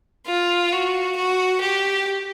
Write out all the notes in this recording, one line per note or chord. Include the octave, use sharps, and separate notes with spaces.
F4
F#4
F#4
G4